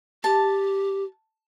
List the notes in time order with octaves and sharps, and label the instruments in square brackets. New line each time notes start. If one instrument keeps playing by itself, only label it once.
[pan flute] G4 [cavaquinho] A5